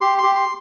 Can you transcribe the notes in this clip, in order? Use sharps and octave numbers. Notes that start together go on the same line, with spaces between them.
G4 C6
C6
G4
C6